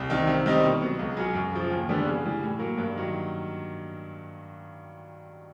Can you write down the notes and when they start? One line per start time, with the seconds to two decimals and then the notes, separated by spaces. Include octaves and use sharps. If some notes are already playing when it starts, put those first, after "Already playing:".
Already playing: C2
0.10 C3 D#3
0.27 C3
0.46 D#3 G3 C4 D#4
0.64 B2
0.81 F#3 B3
0.99 C#2
1.17 C#3 F#3
1.34 F#2
1.52 C#3 F3
1.70 D#2
1.88 D3 G3 B3 D4
2.06 C#3
2.23 E3 G3
2.42 A2
2.59 F#3 A#3
2.78 G2
2.95 D#3 F#3